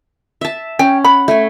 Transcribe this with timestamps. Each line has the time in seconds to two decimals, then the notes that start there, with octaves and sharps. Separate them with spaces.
0.41 E5 A5
0.79 C#4 G5
1.04 F#5 B5
1.28 A3 G#5